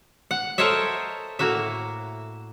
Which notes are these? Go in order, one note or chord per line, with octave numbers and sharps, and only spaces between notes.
F#5
A4 A#4 C5 C#5 D#5 E5
A2 A#3 F#4 E5